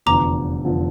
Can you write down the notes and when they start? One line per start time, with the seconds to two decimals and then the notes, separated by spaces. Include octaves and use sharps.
0.06 F1 E2 D3 F3 A#5 D6
0.65 F1 E2 D3 F3